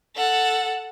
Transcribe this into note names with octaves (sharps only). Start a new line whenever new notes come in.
A4 F#5